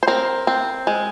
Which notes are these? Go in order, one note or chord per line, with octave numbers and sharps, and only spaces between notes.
C5
C4 A#4
C4
G#3